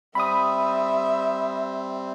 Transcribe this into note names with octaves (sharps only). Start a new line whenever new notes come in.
G3 C4 E5 B5 D#6